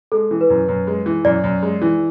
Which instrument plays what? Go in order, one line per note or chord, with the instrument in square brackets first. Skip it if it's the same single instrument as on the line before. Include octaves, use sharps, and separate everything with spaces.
[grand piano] G#3 [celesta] A4
[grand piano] E3
[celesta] B4
[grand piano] F#2
F#2
G#3
E3
[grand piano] F#2 [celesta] D5
[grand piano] F#2
G#3
E3